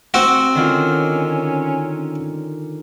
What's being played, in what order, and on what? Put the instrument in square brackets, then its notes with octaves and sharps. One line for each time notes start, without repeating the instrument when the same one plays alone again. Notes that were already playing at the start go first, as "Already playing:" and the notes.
[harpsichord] C4 F#4
[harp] D3 D#3 F4 [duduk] C#4